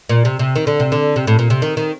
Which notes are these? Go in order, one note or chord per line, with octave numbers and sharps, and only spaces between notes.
A#2
C3
C3
D#3
D3
C3
D3
C3
A2
A#2
C3
D#3
D#3